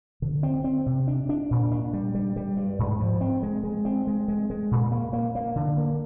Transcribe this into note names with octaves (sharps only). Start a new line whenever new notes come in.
D3
C4
C4
C3
D4
D4
A#2
D4
G3
G3
G3
G2
G#2
F3
C4
G#3
G#3
C4
G#3
G#3
G#3
A#2
A#3
A#3
A#3
D3
A#3